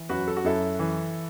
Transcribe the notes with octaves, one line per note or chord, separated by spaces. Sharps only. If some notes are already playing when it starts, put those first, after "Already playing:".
Already playing: E3
F#2 F#4 B4
A4
F#4
F#2 E4 A4
E3